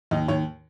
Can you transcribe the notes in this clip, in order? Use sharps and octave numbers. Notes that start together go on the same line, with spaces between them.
D#2 D#4
D#2 C#5